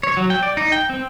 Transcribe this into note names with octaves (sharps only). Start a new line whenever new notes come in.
C#5
F#3
G5
D5
D#4
G5
C4